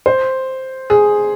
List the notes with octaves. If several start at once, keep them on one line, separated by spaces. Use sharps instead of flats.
C5
G#4